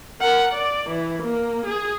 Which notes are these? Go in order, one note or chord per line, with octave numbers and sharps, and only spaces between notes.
A#4 F#5
D5
E3
A#3
G#4